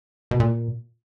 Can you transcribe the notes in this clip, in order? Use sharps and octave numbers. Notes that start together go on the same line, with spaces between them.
B2
A#2